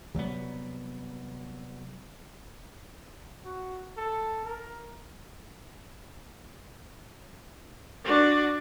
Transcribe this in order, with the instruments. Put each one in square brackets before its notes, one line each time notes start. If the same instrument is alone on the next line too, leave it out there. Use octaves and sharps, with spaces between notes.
[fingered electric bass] C3 F#3 G3 B3
[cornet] F#4
A4
A#4
[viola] D4 F#4